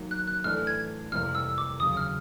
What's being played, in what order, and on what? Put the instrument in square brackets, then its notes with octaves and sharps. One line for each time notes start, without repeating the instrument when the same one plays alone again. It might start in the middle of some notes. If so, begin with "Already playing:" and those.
Already playing: [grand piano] D#3 F#3 A#3
[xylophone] F#6
F#6
[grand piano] A2 E3 A3 D4 [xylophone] F6
[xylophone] G#6
[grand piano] F2 C3 E3 G3 A#3 [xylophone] F6
[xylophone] E6
D6
[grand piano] D#2 C#3 F#3 [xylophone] D#6
[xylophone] F6